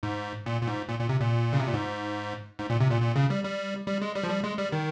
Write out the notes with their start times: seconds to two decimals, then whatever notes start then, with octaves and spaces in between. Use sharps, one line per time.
0.03 G#2
0.46 A#2
0.61 A#2
0.67 G#2
0.89 A#2
0.99 A#2
1.09 C3
1.21 A#2
1.53 C#3
1.60 C3
1.67 A#2
1.74 G#2
2.59 G#2
2.70 A#2
2.80 C3
2.91 A#2
3.02 A#2
3.16 C#3
3.30 G3
3.44 G3
3.87 G3
4.02 G#3
4.15 G3
4.23 F3
4.30 G3
4.44 G#3
4.58 G3
4.72 D#3